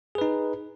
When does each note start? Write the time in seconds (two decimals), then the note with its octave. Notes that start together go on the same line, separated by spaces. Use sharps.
0.15 G#4
0.18 B4
0.21 D#4